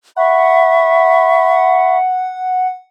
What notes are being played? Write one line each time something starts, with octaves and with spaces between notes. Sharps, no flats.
E5 F#5 B5 C#6